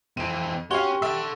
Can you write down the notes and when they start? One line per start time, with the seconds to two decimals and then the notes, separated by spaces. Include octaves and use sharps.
0.17 F2 E3 C4 D#7
0.71 C#4 F#4 G4 C#5 F5 C6 C#6 G7
1.02 A4 E5 F#5